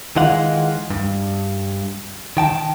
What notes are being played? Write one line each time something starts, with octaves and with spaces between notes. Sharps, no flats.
D#3 E3 G#3 F4 F#5
G2
D#3 G5 A5